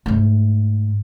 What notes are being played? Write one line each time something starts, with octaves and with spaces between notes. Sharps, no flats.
G#2 A3